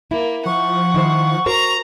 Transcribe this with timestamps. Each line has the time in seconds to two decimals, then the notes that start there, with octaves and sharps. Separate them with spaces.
0.11 A#3 E4
0.46 F3 F#5 C#6
0.94 D#3 E4 C5
1.46 F#4 A#4 C5 A#5